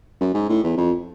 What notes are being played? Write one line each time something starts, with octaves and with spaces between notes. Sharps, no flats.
F#2
G#2
A2
E2
F2